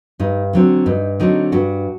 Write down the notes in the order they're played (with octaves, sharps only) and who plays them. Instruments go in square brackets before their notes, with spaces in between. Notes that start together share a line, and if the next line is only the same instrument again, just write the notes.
[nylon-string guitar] G2 D#4
D3 F#3 C4
G2 D#4
D3 F#3 C4 D#4
G2 F#4